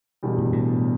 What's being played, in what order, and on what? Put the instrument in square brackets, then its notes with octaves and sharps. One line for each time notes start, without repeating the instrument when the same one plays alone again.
[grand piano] E1 E2 B2 G3
[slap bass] A2
A2